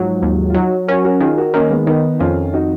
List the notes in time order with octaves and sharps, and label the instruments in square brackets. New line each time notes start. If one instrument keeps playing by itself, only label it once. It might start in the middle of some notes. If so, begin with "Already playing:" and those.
Already playing: [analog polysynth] G#2 F#3 [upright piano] F3
[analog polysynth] D#2
[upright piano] F4
[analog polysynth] F#3 [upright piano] D#4 F#4
[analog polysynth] C#4 [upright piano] F#4 A#4
[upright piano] F#4 A#4
[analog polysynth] D#3 [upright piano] F4 G#4
[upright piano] F#4 A#4
[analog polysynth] D#3 [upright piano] A#3 C#4
[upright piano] G#3 B3
[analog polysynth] D#3 [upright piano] B3 D#4
[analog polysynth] F2 [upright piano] C#4 F4
[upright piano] D#4 F#4